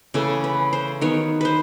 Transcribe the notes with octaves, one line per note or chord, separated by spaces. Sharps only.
C#3 E3 A3 A4
B4
C5
D#3 F#3 B3 C#5
B4 C5